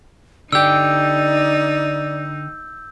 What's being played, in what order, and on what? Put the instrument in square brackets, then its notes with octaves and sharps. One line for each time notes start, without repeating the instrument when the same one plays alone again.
[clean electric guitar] D3 G4 [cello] D#4 [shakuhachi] D5 [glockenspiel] E6 G6